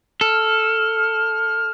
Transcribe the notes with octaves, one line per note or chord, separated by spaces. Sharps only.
A4 F6